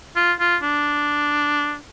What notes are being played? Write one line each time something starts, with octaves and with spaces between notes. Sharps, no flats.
F4
F4
D4